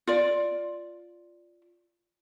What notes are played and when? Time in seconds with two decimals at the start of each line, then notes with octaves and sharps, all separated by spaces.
0.07 F4 D5